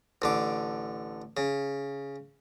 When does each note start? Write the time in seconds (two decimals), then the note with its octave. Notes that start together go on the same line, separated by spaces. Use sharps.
0.22 A1 D3 D6
1.37 C#3